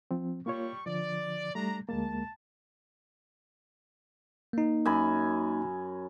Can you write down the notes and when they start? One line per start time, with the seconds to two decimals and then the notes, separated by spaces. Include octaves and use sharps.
0.11 F3 C4
0.46 G3 A#3 F4 C#5 C#6
0.86 D3 F3 D5
1.55 G3 A3 D4 A#5
1.89 D2 G#3 A#3 A5
4.53 A#3 D#4
4.85 F#2 G#5 B5